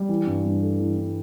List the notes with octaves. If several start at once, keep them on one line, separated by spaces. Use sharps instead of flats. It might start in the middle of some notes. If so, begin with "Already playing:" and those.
Already playing: G3
E3
G2
G2
A3
E3
G2